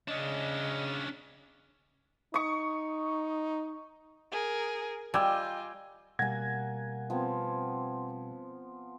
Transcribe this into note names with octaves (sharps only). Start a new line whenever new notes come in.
C#3 C#4 D4 D#5
D#4 C#6 D#6
G#4 A#4
G3 F4 D#5 G5 G#5 D6 E6
B2 G3 A#3 F#5 G#5 G#6 A#6
F3 B3 C4